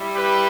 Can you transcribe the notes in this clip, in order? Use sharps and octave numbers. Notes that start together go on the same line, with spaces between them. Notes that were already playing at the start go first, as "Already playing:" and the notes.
Already playing: G3 E4
G4 B4